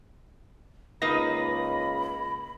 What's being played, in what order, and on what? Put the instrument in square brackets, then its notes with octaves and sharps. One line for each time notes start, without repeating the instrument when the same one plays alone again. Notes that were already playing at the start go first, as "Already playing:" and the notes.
[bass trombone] C#2 [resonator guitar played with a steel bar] A#3 D#4 B4 [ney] B5 [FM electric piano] A#6